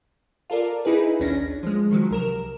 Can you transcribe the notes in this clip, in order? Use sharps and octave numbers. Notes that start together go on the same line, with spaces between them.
F4 A4 A#4 D5
D#4 E4 G#4 B4
A#1 D#2 C#4 D4 A#6
F3 G#3
D#3 F3 F#3
C2 A#4 E7